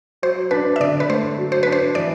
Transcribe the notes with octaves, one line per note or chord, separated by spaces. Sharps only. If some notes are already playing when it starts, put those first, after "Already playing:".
F#3 C5
D4 B4
E5
D3 D5
B4
A3 C5
F#3
C5
D4 B4
C5
E3 D5